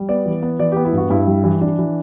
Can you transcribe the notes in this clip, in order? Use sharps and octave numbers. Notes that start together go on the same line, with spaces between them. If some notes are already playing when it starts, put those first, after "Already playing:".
Already playing: G3
B3 D5
E3
B3
E3 D5
G4
B3
E4
G2 F#4
G2 E4
G3
E3
E3 D4
E3